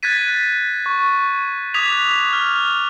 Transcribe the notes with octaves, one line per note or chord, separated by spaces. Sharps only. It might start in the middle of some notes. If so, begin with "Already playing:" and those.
F#6 G#6 A6 B6 D#7
C#6
D6 D#6 F#6 G#6 B6 F7
F6